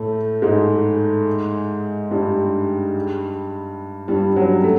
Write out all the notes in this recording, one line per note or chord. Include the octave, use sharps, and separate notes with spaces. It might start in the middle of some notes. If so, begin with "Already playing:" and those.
Already playing: A2 A3
G#2 G#3
G2 G3
G2 G3
F#2 F#3
A3